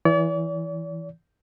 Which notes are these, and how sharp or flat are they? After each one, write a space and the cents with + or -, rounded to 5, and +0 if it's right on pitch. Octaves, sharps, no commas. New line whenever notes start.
E3 +0 D5 -45